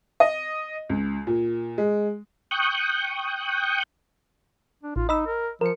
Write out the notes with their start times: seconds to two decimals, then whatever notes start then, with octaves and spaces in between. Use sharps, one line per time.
0.20 D#5
0.90 C#2
1.27 A#2
1.78 G#3
2.51 G5 C#6 D#6 F#6 G6
4.83 D4
4.96 A1 F4
5.09 D#4 D#5 B5 E6
5.26 A#4
5.61 F3 A#4 C#7